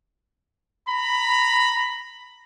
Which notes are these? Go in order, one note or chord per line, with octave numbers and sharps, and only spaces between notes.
A#5 B5